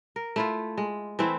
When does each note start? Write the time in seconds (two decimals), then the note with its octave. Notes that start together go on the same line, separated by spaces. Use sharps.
0.16 A#4
0.36 A3 E4 F4
0.77 G#3
1.19 E3 A3 C4 E4